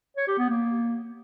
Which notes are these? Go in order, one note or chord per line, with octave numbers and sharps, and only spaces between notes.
C#5
G4
B3
A#3